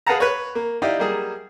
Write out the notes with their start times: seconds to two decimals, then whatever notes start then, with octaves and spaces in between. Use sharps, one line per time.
0.06 G#4 B4 F5 F#5 A5 A#5
0.20 B4 C#5
0.55 A#3
0.82 D#4 E4 G4 D5 D#5 F5
0.99 F#3 G3 A#3 G#4